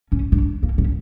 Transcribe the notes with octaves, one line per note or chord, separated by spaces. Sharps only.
C#4
D4
A#3
C#4